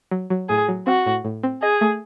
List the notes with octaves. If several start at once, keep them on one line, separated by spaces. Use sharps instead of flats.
F#3
F#3
A2 G#4
F#3
C4 F#4
A2
A2
C4
G#4 D#5
A3